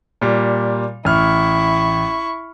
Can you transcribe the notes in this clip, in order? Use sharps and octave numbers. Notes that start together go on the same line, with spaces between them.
A#2 G3
A1 E4 C#6 F6